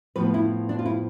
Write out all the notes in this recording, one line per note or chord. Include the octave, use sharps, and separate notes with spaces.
A2 F3 B3 B4
E4
D4
F4
E4